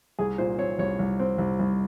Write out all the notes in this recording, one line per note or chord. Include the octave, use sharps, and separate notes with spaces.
C2 G#4
A#2 C5
C4 C#5
C2 C#5
C2
C4
C2
C2